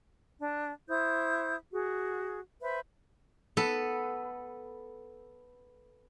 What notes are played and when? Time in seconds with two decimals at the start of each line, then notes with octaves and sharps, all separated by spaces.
0.41 D4
0.88 E4 C5 D#6 G6
1.72 F#4 G#4
2.61 B4 C5 E5
3.57 B3 A4 B4